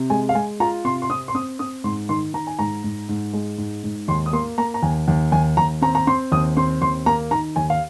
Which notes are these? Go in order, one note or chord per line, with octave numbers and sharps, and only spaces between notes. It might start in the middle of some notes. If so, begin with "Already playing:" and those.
Already playing: C3
G#3 G#5
F5
G#3 G#5
F4 A#5
C3 C6
C6
C4 D#6
C6
C4 D#6
C4 D#6
G#2 C6
D#3 C6
D#3 A#5
G#5
G#2 A#5
G#2
G#2
G#3
G#2
G#2
D#2 C6
D#6
A#3 C6
A#3 A#5
A#5
D#2 G#5
D#2
D#2 G#5
D#2 A#5
C4 A#5
A#5
C4 C6
D#2 D#6
C4 C6
D#2 C6
A#3 A#5
D#3 A#5
D#2 G#5
F5